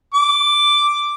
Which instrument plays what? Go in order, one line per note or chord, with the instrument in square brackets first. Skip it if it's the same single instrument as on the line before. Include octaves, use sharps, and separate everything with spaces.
[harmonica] D6